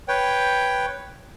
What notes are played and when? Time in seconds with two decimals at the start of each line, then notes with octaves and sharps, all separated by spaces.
0.08 B4 C#5 G5